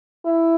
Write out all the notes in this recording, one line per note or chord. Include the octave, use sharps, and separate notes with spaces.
E4